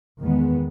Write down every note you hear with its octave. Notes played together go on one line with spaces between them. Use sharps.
E2 D#3 G#3 B3